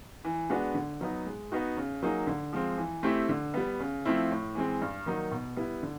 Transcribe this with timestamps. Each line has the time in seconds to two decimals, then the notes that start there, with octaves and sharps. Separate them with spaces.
0.25 E3
0.50 G#3 B3 D4 F#4
0.74 D3
1.01 F#3 B3 D#4
1.26 G#3
1.52 B3 D#4 F#4
1.77 C#3
2.03 F#3 A#3 D#4 G#4
2.27 D3
2.53 F3 G#3 C4
2.78 E3
3.03 A3 C4 E4 G4
3.29 D3
3.54 G3 B3
3.80 C#3
4.05 F3 A3 C4 E4
4.31 A2
4.55 E3 G#3 C4
4.82 G2
5.06 D#3 F#3 A#3 D#4
5.31 B2
5.57 G3 B3 E4
5.83 D3